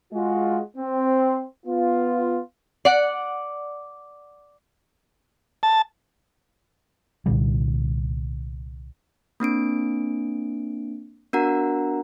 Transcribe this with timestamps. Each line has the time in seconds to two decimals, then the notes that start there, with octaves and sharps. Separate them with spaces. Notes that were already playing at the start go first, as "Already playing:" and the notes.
0.13 G#3 F4 F#4
0.77 C4
1.66 B3 F4
2.85 D5 F#5
5.63 A5
7.26 C2 A#2 D3 G3
9.40 A#3 C4 D4 D7
11.33 B3 D4 F#4 A#4 F#5 A#5